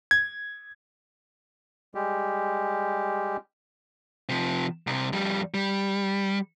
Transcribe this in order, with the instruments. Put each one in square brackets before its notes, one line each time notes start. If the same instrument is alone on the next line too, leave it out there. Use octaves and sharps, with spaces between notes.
[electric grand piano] G#6
[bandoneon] G3 G#3 G4
[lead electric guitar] C3 F3
C2 C3
F2 G3
G3